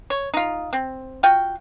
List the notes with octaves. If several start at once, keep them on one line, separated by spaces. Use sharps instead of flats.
C#5
D#4 F4
C4
F4 F#4 G5